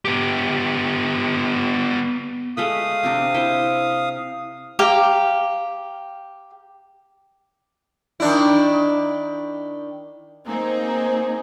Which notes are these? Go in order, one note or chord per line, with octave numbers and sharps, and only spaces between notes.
B3 G4
G#3 A3 B4 F5 D#6
C3 C4 D4
E4 C5
G4 F5 A#5
D#3 D4 E4
A#3 C4 D#4 G#4